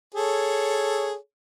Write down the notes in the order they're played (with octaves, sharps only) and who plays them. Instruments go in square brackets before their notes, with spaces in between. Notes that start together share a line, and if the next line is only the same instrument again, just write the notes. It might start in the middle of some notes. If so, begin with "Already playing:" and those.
[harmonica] G#4 A4 C#5